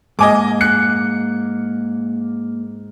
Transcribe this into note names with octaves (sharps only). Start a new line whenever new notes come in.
G#2 A#3 D#5 G#5 D6
F#6 C#7